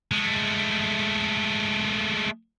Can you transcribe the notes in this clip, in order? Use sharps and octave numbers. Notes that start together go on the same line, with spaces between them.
G#3 A3